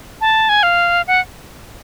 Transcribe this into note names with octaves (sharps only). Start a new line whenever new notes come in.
A5
G#5
F5
F#5